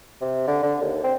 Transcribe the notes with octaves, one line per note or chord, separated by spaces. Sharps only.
C3
D3
D3
D#2
C4